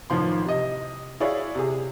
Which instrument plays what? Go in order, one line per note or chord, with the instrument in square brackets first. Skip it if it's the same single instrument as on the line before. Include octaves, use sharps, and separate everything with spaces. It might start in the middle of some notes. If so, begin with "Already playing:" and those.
[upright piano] A1 D#3 F3 C6
C3 D#5
E4 F#4 G#4 C#5 D5 F5
C3 G#4